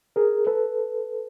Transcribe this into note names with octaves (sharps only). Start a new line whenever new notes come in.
G#4 A#4
A4 B4